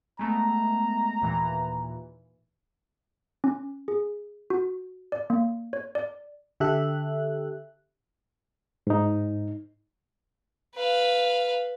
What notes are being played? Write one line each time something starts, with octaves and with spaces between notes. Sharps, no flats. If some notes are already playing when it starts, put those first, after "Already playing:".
G#3 A3 B3 A#5
D#2 A#2 E3
C#4
G#4
F#4
D5
A#3
C#5
D5
D3 G4 A4 E5 F#6
G#2 D#4
B4 F5